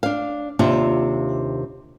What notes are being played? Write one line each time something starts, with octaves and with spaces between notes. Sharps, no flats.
D4 F5
D#2 C3 D4 F4 E5